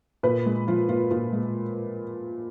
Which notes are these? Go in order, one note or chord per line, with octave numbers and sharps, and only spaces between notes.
A#2 B4
G#3
F3 F4
A#2 F4
A#2 F4
G#3